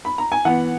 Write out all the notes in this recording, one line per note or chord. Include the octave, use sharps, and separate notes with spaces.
B5
A#5
G#5
E3 B3 F#5